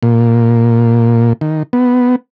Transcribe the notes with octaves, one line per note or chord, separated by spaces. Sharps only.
A#2
D#3
B3